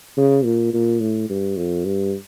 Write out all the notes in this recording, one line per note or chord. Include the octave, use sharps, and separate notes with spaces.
C#3
A#2
A#2
A2
G2
F2
G2